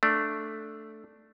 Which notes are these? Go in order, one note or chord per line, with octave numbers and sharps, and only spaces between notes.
A3 D4